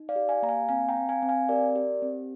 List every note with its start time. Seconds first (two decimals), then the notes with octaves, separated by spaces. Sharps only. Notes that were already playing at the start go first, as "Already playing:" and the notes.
Already playing: D#4
0.09 D5 F5
0.16 G4
0.29 F5 G#5
0.43 A#3 A#5
0.49 F5 G#5
0.69 C4 F5 G#5
0.89 G5 A#5
0.96 C4
1.09 F5 G#5
1.22 C4
1.29 F5 G#5
1.49 G4 A#4 D5
1.76 G4
2.02 C4